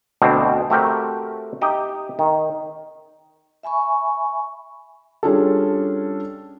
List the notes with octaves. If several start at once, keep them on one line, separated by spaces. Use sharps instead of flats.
D2 B2 C4 D4
A3 C4 F#4 G4 A#4 C5
D#4 G4 D#5 E5
D#3
E5 G#5 B5 C#6
G3 C#4 D4 F4 G#4 A4